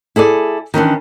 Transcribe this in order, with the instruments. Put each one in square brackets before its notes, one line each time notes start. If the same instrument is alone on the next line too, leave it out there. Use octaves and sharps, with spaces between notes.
[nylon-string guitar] E4 G#4 A4 D5
D#3 E3 C#4 D4